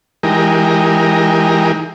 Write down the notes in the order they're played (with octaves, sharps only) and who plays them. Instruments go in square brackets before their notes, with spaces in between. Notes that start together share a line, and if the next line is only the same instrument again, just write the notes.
[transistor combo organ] E3 G#3 D#4 G4 A#4